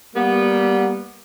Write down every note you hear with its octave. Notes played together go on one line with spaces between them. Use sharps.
G3 A#3 B3